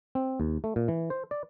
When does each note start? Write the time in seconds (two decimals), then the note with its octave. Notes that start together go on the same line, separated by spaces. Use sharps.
0.15 C4
0.40 D#2
0.64 A3
0.76 A#2
0.88 E3
1.10 C5
1.31 D5